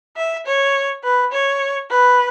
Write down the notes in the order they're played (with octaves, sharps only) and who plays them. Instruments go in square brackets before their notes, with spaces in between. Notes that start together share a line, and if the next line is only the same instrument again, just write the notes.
[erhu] E5
C#5
B4
C#5
B4